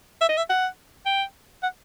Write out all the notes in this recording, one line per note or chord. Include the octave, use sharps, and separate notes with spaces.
E5
D#5
E5
F#5
G5
F#5